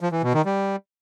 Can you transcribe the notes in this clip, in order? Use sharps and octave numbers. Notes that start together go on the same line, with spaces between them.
F3
E3
B2
D#3
G3